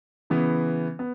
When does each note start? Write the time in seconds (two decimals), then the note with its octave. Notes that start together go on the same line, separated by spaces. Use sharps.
0.30 C#3 E3 B3
0.99 B3